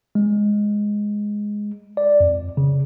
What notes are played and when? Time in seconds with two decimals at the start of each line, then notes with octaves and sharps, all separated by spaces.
0.15 G#3
1.97 D5
2.20 F2
2.57 C#3